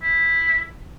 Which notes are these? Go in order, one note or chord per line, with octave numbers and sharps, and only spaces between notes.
E4